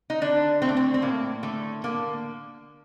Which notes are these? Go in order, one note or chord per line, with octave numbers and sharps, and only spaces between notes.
D#4
D3 D4
A3 C4
D4
C4
C4
A2 A#3
D3 A3
D3 A#3